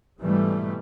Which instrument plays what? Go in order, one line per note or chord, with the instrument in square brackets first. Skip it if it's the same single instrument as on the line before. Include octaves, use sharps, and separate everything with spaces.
[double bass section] G#2 B2 E3 G3 A3